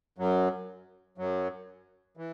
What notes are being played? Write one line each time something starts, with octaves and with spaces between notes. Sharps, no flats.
F#2 F#3
F#2 F#3
E3